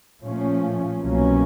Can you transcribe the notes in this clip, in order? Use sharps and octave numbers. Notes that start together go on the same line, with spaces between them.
A#2 F3 A3 C#4
C2 B2 F#3 A#3 C#4